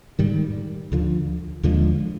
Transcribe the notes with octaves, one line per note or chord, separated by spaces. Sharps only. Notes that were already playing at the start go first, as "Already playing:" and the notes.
G#2 D#3 G3
D2 D3 F3
D#2 D3 F3 G#3